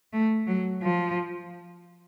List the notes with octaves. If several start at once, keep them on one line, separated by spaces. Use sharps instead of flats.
A3
F#3
F3